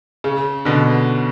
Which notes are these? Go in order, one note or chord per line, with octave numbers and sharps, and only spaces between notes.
C#3
B2 D3